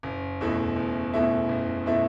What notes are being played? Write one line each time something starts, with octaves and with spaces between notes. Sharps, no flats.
F#1
E2 B2 A3 E4
F#1
E2 B2 A3 E4
F#1
B2 A3 E4